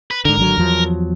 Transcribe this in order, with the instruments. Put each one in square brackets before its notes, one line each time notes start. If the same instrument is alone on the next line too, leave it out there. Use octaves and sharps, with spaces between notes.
[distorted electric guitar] B4
[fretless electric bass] G#2 D3 [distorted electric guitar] A#4
[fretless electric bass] G#1 D3 F#3
E2 F3 F#3